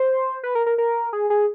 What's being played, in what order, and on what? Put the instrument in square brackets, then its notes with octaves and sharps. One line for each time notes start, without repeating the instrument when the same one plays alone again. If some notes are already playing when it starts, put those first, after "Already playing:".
Already playing: [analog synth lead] C5
B4
A#4
A#4
A#4
G#4
G#4